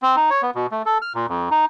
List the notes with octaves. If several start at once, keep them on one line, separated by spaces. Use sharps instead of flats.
C4
D#4
C#5
B3
B2
A3
A4
F6
A#2
F2
D#4